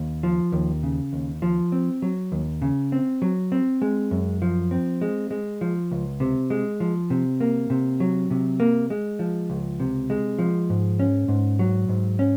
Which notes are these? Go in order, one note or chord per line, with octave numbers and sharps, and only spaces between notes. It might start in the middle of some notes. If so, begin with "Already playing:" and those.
Already playing: D#2
F3
D#2
C#3
D#2
F3
C4
F#3
D#2
C#3
C4
F#3
C4
G#3
F#2
F3
C4
G#3
G#3
F3
C#2
C3
G#3
F3
C3
A#3
C3
F#3
C3
A#3
G#3
F3
C#2
C3
G#3
F3
G#2
C#4
G#2
F#3
G#2
C#4